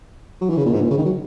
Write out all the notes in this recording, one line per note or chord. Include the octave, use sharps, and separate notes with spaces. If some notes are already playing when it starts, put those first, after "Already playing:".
F#3
E3
C#3
A#2
G#2
A#2
C#3
D#3
F#3